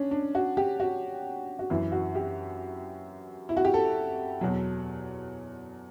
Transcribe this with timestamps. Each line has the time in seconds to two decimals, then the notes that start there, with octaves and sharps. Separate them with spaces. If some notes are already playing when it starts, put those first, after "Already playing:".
Already playing: C#4 D4
0.11 D4
0.35 F#4
0.57 G4
0.80 F#4
1.59 F#4
1.70 F#2 E3 E4
1.92 F#4
2.15 G4
3.49 E4
3.57 F#4
3.65 G4
3.74 A4
4.41 E2 B2 F#3